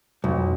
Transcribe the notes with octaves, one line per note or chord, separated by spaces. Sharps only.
B1 F2